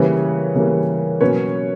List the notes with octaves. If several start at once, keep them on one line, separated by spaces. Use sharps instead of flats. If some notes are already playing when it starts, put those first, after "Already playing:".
Already playing: C#3 E3 G3 A#3 B4 C#5
C#3 E3 G3 A#3
B2 F#3 A#3 C#4 B4 C#5